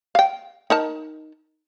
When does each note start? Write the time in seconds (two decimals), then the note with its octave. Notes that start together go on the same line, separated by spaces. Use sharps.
0.15 F5 G5
0.70 D#4 A#4 A5